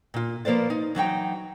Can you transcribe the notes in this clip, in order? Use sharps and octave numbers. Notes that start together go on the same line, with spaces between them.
A#2 F4
F3 A#3 B4 C5 D5
D#4
E3 F#3 D#4 G5